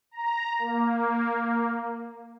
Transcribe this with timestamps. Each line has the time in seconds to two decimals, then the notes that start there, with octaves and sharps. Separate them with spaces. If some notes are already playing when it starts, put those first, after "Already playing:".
0.11 A#5
0.59 A#3